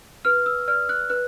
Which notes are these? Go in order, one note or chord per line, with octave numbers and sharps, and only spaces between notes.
B4 F6
E6
D5 F6
F#6
B4 F#6